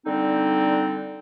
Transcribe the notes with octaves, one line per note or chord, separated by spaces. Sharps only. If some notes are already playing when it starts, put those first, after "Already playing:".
D3 G3 C4 D#4